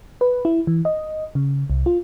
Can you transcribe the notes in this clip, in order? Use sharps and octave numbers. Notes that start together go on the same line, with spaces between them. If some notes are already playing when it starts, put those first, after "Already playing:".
B4
E4
E3
D#5
C#3
C2
F4